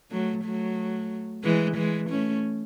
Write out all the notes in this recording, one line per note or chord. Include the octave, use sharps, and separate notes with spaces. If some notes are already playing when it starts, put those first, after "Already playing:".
F#3 A3
F#3 A3
E3 G#3
E3 G#3
A3 C#4